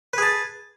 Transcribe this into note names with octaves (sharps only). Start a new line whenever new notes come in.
G#4 B4 A5